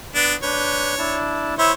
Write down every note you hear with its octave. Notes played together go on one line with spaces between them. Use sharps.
B3 D4
D4 B4 C#5 G6
D4 E4 A5
E4 C5 C#5 E5